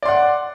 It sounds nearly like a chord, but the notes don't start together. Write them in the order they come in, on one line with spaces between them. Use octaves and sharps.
D5 C6 F#5